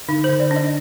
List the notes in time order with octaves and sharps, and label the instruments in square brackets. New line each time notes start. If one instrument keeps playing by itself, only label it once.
[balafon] D3 D#4
D3 C5
D5
D4
D#5